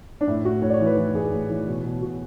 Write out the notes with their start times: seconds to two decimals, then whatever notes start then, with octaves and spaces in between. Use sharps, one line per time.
0.21 D4
0.27 A2 E4
0.45 A2 F#4
0.62 A2 C#5
0.70 D5
0.74 C#5
0.80 E3
0.86 B4
0.97 E3
1.14 A2 G#4
1.32 A2
1.50 E3
1.67 B2
1.84 B2
2.02 B2 F#4